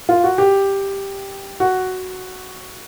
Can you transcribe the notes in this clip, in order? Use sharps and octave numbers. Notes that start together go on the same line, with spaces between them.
F4
F#4
G4
F#4